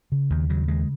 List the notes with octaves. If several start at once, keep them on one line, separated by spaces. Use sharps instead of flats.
C#3
D#2 D#3
C#3 F#3
D#2 G#3